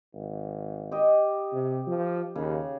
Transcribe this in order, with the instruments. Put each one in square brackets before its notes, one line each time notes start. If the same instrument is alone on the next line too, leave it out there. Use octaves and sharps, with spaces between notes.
[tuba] G#1
[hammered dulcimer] G4 D#5
[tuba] C3
F3
[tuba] D#2 [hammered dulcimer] C#3